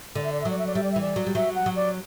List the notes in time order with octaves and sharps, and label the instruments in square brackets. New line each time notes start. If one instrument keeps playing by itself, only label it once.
[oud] D3 [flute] D5
[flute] E5
D5
E5
[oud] F#3 [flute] D5
[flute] E5
D5
[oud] G3 [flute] E5
[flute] D5
E5
[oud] E3
[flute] D5
[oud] F#3
G3
[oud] F#3 [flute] E5
[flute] F#5
[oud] F#3
[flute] D5